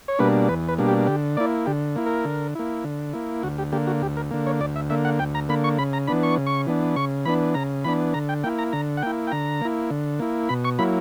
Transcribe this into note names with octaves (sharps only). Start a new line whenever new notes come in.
C#5
B2 G3 A#3 D4 B4
E2 B4
B4
B2 G3 A#3 D4
G4
D3 G4
A#3 E4 D5
D3 G4
A#3 E4
A#4
D3
A#3 E4
D3
A#3 E4
D2 F#4
G4
D3 A#3 G4
F#4
D2 G4
A#4
D3 A#3
C#5
D2 D5
E5
D3 A#3 E5
F#5
D2 G5
A#5
D3 A#3 B5
C#6
C#3 B5
A#5
E3 B3 D4 B5
C#6
C#3
C#6
E3 B3 D4
C#3 C#6
E3 B3 D4 B5
C#3 A#5
E3 B3 D4 B5
D3 A#5
G5
A#3 E4 G5
A#5
D3 A#5
F#5
A#3 E4 G5
G5
D3 A#5
A#3 E4
D3
A#3 E4
B2 B5
C#6
F#3 A#3 E4 B5